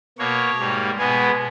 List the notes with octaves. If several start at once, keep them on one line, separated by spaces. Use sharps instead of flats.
B2 A#3 C#5
G#2 G3 A#3
B2 G#3 B3 G#4